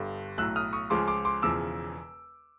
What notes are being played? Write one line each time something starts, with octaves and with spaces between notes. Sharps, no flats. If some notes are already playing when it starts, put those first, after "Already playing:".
Already playing: G1 G2 D3
B1 A2 F#3 E6 F#6
D#6 F6
C#6 D#6
C#2 C#3 F3 G#3 C6 D6
C6 D6
C6 D6
E1 E2 C#3 F3 D6 E6